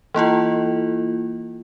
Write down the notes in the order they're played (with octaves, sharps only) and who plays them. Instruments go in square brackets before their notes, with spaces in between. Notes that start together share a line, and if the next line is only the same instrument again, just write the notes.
[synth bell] E3 A#3 E4 F4